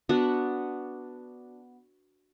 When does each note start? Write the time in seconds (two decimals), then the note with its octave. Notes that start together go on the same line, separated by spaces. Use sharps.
0.09 B3 D4 F#4